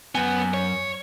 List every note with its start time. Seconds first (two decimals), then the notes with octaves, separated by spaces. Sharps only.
0.15 F#2 B3 G#5
0.54 C#5